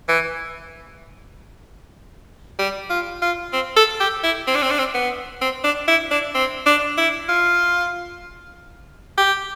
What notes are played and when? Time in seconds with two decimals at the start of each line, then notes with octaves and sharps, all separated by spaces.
0.08 E3
2.59 G3
2.90 F4
3.22 F4
3.53 C4
3.77 A4
4.00 G4
4.23 E4
4.47 C4
4.55 D4
4.62 C4
4.71 D4
4.79 C4
4.94 B3
5.41 C4
5.64 D4
5.88 E4
6.11 D4
6.35 C4
6.66 D4
6.97 E4
7.29 F4
9.18 G4